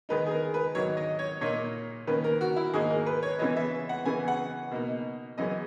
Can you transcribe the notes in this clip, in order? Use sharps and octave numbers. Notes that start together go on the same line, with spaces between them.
D#3 G#3 D#4 B4
G#4
A#4
B4
G#2 D#3 F#3 C#5
D#5
C#5
A#2 A#3 D#4 C#5
D#3 A#3 C#4 B4
A#4
F#4
E4
G#2 D#3 A#3 D#4 G#4
A#4
B4
C#5
C#3 E3 G#3 B3 D#5
E5
F#5
C#3 E3 B3 G#5
F#5
B2 A#3 D#4
F#2 E3 G#3 D#5